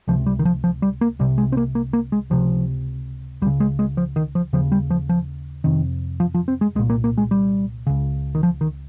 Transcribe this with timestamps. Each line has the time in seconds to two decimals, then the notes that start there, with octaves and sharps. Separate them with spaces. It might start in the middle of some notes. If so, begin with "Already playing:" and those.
0.08 C#2 C3 F3
0.26 G3
0.39 D#3
0.45 F3
0.64 F3
0.82 G3
1.01 A#3
1.19 C2 C3 G3
1.38 G#3
1.52 C4
1.57 A#3
1.75 A#3
1.93 A#3
2.12 G#3
2.30 C#2 C3 F3
3.42 C#2 G3
3.46 C#3
3.60 G#3
3.79 G#3
3.97 F3
4.16 D#3
4.35 F3
4.53 D#2 C#3 F3
4.72 G3
4.90 F3
5.09 F3
5.64 F2 C3 D#3
6.20 F3
6.34 F3
6.48 C4
6.61 G#3
6.75 C2 G#3
6.79 A#2
6.90 A#3
7.04 A#3
7.18 G#3
7.31 G3
7.87 C#2 C#3
8.35 D#3
8.43 F3
8.61 D#3